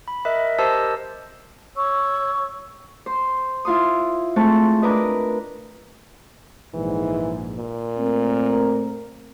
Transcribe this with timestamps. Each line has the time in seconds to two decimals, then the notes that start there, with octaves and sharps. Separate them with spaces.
0.08 B5
0.25 A#4 D#5 E5 F#6
0.59 G4 A#4 C5 D#5 A5 E6
1.75 C#5 C#6 E6
3.06 C5
3.65 E4 F4 C6 D#6
4.36 G#3 A3 C4 A5 C#6
4.82 D4 A#4 B4 D#5
6.74 A#1 G#2 E3
7.57 A#2
7.97 A3 C4 A#4